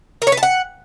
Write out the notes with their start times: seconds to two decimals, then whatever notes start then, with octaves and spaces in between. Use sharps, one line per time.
0.22 A#4
0.27 C#5
0.32 B4
0.37 A5
0.43 F#5